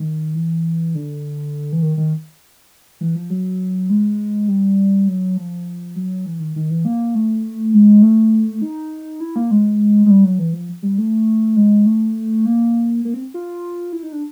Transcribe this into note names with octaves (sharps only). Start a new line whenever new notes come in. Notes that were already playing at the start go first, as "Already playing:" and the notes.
Already playing: D#3
E3
D3
E3
D#3
D#3
E3
F3
F#3
G#3
G3
F#3
F3
F#3
E3
D#3
D#3
E3
A#3
A3
G#3
A3
D#4
E4
A#3
G#3
G#3
G3
F#3
E3
F3
G3
A3
G#3
A3
A#3
A#3
C4
F4
E4
D#4
D4